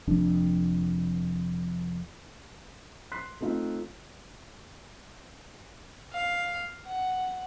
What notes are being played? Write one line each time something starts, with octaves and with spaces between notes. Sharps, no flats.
F1 F2 D4
C6 F#6 B6 C7
A3 C4 D#4 F4
F5
F#5